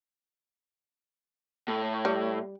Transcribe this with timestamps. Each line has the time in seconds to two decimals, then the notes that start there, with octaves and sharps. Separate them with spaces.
1.68 A2
2.05 G3